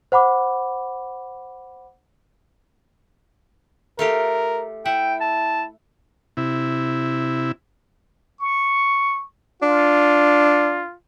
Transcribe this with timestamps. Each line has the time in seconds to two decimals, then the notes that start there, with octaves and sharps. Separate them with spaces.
0.12 C5 F#5 B5 D6
3.99 A3 F4 G4 A#4
4.85 E4 E5 F#5 G5
5.21 A5
6.37 C3 E4
8.40 C#6
9.62 D4 F4